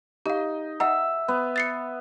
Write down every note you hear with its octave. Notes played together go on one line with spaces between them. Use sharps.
D#4 G4 F5
D#5 E5 F#5 A#5
B3
A6 C7 C#7